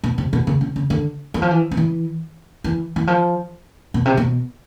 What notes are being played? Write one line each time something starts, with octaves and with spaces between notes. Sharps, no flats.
B2
C3
B2
C#3
C#3
C#3
D3
E3
F3
E3
F3
E3
E3
E3
F3
B2
C3
B2